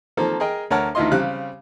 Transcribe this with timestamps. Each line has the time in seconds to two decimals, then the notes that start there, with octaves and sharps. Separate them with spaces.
0.17 D#3 F3 A#3 C4 A4
0.40 G#4 A#4 D#5 G5
0.70 D2 A#4 C#5 F#5 A5 F6
0.95 D2 D#3 E4 F4 D#5 C6
1.12 C#3 G3 C4 F5 F#6